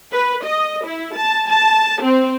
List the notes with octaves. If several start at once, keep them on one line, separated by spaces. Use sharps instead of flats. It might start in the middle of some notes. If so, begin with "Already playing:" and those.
B4
D#5
E4
A5
A5
C4